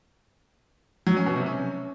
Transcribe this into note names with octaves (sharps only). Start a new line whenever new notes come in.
F#3
C#4
B2
C3
C#4